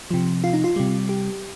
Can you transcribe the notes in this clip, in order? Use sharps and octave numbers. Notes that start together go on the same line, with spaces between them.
C3 F3
F4
D#4
F4
C3 G3
G4